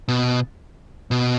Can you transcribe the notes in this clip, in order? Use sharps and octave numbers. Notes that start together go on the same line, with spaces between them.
B2
B2